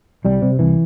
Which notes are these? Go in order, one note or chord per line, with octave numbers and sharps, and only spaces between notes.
C2 G3
C3
C2 E3